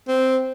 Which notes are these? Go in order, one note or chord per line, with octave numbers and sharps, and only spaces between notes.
C4